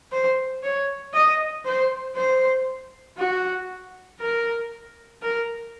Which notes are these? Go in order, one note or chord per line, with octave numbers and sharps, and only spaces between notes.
C5
C#5
D#5
C5
C5
F#4
A#4
A#4